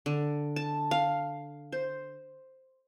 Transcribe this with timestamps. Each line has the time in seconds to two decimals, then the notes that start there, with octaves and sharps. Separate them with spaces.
0.06 D3
0.56 A5
0.91 F5
1.72 C5